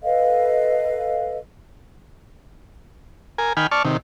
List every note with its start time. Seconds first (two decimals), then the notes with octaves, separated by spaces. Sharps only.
0.03 A4 B4 D#5 F5
3.38 A#4 G#5
3.57 D#3 G5 G#5 B5 F6
3.71 D5 A5 C#6 F6
3.85 C3 D#3